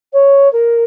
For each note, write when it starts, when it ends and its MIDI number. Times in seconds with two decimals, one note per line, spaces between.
0.12 0.50 73
0.52 0.84 70